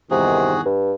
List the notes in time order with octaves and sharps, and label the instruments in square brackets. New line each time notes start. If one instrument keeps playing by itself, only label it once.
[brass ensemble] E2 G2 D#3 [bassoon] C3 [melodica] F#4 G#4
[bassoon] G2